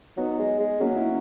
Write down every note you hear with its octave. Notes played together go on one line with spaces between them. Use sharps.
F#3 B3 D#4
G#3
G#3
F#3 A#3 C#4
C#4 E4